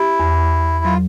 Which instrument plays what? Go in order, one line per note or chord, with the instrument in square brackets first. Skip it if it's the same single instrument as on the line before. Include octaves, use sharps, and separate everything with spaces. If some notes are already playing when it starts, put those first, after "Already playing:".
Already playing: [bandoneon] E4 [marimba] G4
[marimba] E2
E2
[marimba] F#3 [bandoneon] F4